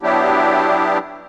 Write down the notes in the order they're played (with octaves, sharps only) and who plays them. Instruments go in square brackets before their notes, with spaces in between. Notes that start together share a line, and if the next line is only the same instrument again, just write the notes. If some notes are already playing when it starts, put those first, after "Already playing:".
[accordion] F#3 B3 D4 E4 G4